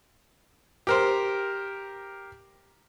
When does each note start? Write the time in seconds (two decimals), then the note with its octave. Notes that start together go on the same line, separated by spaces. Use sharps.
0.87 G4 A#4 C5